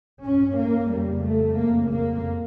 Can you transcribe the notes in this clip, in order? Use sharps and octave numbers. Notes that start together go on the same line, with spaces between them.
G2 C#4
A#3
F2 C#3 G3
A3
F2 C#3 A#3
A#3